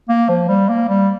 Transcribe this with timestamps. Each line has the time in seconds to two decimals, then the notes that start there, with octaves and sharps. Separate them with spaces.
0.09 A#3
0.29 F3
0.49 G3
0.69 A#3
0.89 G3